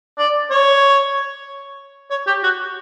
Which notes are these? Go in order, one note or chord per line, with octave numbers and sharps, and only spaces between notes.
D5
C#5
C#5
G4
F#4